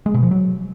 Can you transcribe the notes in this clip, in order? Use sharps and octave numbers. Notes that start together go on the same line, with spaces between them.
G#3
B2
F3
F#3